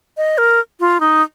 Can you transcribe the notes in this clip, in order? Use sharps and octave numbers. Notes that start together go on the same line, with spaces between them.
D#5
A#4
F4
D#4